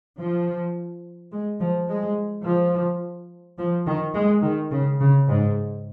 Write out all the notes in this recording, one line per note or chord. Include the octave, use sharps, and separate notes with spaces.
F3
G#3
F3
G#3
F3
F3
D#3
G#3
D#3
C#3
C#3
G#2